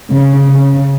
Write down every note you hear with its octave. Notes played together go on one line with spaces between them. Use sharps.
C#3
C#3